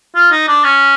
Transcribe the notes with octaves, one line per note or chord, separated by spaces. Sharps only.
F4
D#4
D4
C#4